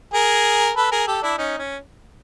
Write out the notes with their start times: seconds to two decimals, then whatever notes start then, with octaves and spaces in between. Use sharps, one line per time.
0.14 G#4 A#4
0.76 A4 B4
0.92 G#4 A#4
1.07 G4 A4
1.22 D4 E4
1.38 C#4 D#4
1.58 C#4